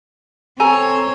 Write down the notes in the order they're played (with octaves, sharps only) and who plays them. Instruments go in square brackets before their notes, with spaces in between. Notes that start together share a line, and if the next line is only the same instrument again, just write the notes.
[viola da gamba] C4 C#5 [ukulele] A4 G#5 A#5